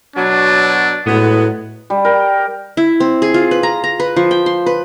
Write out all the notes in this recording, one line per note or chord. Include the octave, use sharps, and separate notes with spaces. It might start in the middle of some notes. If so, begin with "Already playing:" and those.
B2 F#3 D4
A2 F#3 G#3 B3
G3
A#4 G5
E4
C4
G#4
F4
B4
A#5
A#5
B4
F3
G5
C6
B4